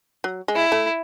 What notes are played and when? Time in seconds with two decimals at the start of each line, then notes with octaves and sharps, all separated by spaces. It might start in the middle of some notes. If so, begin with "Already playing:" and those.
0.24 F#3
0.48 G#3
0.55 E4
0.72 A3